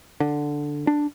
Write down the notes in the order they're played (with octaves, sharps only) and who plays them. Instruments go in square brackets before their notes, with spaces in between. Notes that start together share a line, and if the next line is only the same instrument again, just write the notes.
[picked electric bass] D3
D4